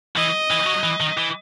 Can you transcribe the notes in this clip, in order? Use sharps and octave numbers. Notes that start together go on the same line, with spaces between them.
E3 D#5
E3
F#3
E3
D#3
E3